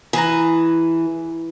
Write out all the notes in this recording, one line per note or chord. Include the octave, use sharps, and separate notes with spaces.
E3 G#4 B4 A#5